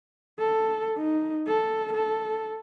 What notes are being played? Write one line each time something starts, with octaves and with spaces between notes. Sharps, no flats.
A4
D#4
A4
A4